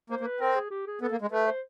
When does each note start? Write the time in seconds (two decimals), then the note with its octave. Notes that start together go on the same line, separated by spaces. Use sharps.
0.10 A#3 C5
0.21 A#3
0.25 B4
0.41 C4 A#4
0.56 G#4
0.71 G4
0.87 G#4
1.01 B3 A4
1.11 A#3
1.22 G#3
1.32 A3 B4
1.47 C5